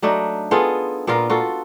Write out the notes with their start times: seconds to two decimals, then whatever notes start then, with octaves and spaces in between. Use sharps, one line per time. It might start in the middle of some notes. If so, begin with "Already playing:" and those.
0.02 F#3 A3 D4 D#4
0.51 B3 F4 G#4 A4
1.07 A#2 B3 F4 A#4
1.30 F4 F#4 A4